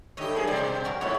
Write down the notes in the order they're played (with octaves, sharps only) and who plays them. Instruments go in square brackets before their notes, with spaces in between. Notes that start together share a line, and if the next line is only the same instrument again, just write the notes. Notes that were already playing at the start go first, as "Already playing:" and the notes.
[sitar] G2 D3 G4 [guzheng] C#5 D#5 E5
[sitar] F#2 A#3 G#4 [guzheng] G#3
[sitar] B2 D5 [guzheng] G3 G#3 C4
[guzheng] C#4 F#4 A#4
[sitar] G#2 C#3 F#3 [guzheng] E4 C#5